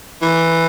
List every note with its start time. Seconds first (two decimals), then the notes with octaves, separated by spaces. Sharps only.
0.22 E3